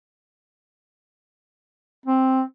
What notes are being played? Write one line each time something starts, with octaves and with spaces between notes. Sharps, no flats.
C4